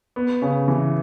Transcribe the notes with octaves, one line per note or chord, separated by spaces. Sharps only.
B3
C#3
E3